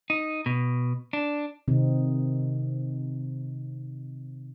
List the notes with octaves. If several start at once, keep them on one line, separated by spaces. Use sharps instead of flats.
D#4
B2
D4
C3 D#3 C4 D#4